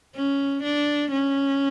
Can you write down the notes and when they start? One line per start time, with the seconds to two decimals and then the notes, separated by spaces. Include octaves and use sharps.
0.16 C#4
0.63 D4
1.11 C#4